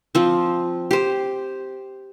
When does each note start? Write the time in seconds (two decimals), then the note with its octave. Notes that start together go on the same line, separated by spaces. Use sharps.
0.15 F3 C4
0.91 G4 C5